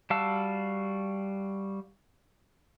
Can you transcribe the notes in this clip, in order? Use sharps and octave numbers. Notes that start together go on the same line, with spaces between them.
G3 F#4 F5 A5 E6